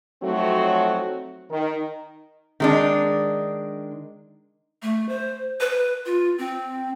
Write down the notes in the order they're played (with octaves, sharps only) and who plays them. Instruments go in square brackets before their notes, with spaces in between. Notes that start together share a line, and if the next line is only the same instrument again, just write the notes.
[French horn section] F3 F#3 A3 C4 D#4 F#4
D#3
[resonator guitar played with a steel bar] D#3 G#3 D4
[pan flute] A3
C5
B4
F4
C4